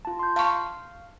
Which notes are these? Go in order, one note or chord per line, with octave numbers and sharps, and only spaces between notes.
F4 A5
C6 G6
F5 A5 C#6